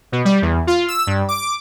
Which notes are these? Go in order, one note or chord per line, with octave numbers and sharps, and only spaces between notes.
B2
G3
E2
F4
E6
G2
D6